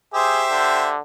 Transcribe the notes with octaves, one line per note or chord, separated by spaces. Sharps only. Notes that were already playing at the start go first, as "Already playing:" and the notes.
G4 G#4 C5 E5
D3